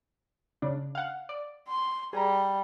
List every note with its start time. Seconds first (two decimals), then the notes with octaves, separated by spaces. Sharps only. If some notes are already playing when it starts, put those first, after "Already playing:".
0.62 C#3 D4
0.95 F5 F#5
1.29 D5
1.68 C6
2.13 G3 G#4 A#5